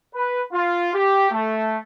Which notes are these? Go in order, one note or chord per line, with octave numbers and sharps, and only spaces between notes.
B4
F4
G4
A3